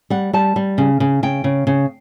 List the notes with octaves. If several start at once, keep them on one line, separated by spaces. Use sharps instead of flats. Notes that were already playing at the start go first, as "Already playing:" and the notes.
G3 F#5
G3 A5
G3
C#3
C#3
C#3 G5
C#3
C#3